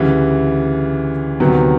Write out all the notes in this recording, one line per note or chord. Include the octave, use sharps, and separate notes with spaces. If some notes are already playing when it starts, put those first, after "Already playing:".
Already playing: D2 C#3 E3 G3
D2 C3 D#3 F#3 B3